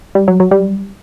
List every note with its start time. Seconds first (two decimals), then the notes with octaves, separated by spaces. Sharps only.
0.15 G3
0.28 F#3
0.40 F#3
0.51 G3